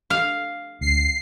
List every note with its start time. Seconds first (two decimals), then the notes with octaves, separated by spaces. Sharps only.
0.10 F5
0.81 D2 C7